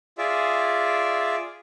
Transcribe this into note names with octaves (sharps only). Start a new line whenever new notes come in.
F4 G#4 D5 E5